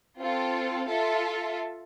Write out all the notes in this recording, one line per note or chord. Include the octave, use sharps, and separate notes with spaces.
C4 F4 A4
F4 A4 E5